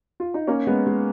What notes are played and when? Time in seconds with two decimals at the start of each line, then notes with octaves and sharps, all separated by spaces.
0.20 F4
0.34 D#4
0.47 A#3 C#4
0.67 G#3 B3
0.87 G#3